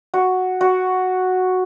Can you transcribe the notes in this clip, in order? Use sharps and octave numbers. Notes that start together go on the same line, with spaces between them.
F#4
F#4